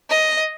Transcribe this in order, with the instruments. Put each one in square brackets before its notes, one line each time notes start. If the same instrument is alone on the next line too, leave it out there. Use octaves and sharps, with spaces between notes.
[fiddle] D#5